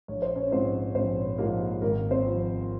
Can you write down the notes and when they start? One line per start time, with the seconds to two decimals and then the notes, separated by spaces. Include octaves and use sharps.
0.08 A#1 C#5
0.22 C5
0.36 C#4 C#5
0.51 G#2 F3 C4 C5
0.95 A#1 C4 C5
1.38 G#2 F3 A#3 A#4
1.81 G#1 A#3 A#4
2.11 C4 C5
2.26 F3